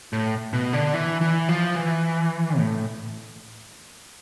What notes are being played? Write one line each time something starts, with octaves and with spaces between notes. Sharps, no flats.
A2
B2
D3
E3
E3
F3
E3
A2